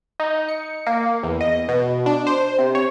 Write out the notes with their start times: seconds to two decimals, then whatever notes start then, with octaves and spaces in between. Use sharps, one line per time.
0.20 D#4
0.49 C#7
0.87 A#3
1.23 E2
1.41 D#5
1.68 B2
2.06 D4
2.27 C5
2.58 C3
2.75 C#5